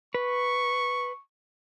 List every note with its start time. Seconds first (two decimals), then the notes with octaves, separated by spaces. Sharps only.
0.14 B4 C#6